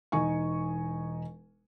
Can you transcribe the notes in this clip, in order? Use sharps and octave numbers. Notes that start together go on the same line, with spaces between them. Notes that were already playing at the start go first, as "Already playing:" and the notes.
E1 D#4 G#5 C#6